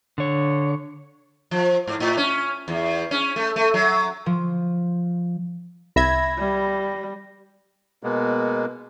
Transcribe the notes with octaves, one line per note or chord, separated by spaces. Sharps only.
D3 C#5
F3
G#2
A2
C#4
E2
C#4
A3
A3
F#3
F3
C2 E5 B5 G#6 A#6
G3
B2 G#3 A#3 B3